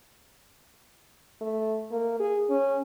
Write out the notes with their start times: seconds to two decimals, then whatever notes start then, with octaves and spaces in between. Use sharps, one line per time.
1.41 A3
1.91 A#3
2.20 G#4
2.50 C#4